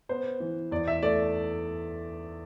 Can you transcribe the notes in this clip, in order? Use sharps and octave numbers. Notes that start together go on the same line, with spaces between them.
B3 C5
E3
E2 D5
E5
A3 D5